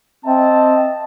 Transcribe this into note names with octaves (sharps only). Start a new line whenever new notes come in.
C4 D#5 E5 A5